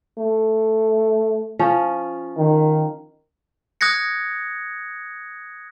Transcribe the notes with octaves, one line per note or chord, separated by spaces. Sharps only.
A3
F3 C#4
D#3
D#6 F#6 G#6 A#6 C#7